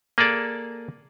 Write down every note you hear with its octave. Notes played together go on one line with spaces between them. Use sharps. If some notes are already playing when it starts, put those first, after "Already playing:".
A#3 G#4 A4 D5